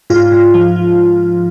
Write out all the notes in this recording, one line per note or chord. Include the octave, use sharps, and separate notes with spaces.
G#2 F4
G#2
F3
F3